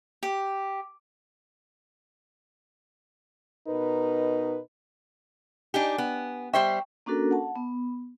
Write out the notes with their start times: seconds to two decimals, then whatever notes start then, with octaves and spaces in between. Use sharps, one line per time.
0.23 G4
3.68 B2 D#4 A#4 B4
5.74 D4 D#4 G4 G#5 D7
5.98 B3
6.53 G3 C5 E5 G5 C#6
7.06 A#3 C#4 D4 F#4 A4 A#4
7.31 F#5 A5
7.56 B3